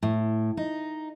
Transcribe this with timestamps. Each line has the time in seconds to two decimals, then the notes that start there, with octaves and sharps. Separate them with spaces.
0.03 A2
0.57 D#4